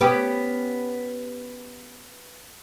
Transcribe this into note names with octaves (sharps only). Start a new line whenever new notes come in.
B3 C#4 G4